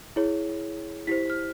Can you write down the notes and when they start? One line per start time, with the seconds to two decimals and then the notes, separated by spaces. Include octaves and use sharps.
0.16 E4 G#4 C#5
1.07 E4 G4 C5 B6
1.30 F6